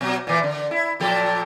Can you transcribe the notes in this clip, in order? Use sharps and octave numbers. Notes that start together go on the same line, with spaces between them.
B2 F#3
A#2 E3
D3
E4
A#2 F3 A4